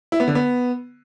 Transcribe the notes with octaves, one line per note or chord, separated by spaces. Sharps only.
E4
B3
D3
B3